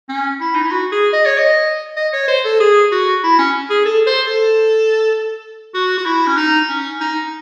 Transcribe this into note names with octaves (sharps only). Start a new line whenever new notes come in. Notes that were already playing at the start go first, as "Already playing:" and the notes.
C#4
E4
D#4
E4
F#4
G#4
D#5
C#5
D#5
D#5
C#5
C5
A4
G#4
F#4
E4
C#4
G#4
A4
C5
A4
F#4
F#4
E4
C#4
D#4
C#4
D#4